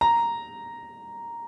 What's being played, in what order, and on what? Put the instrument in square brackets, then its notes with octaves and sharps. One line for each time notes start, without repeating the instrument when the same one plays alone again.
[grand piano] A#5